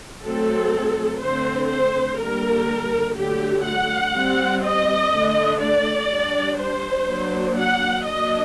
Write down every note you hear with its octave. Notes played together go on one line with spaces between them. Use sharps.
F#3 A3 C4 A4
D3 A3 C4 C5
C5
D3 G3 A#3 A#4
D3 F#3 A3 G4
F#5
G3 C4
D#5
D3 A3 D4
D5
G3 D4
C5
F#3 A#3 D4
F#5
F#3 A#3 D4 D#5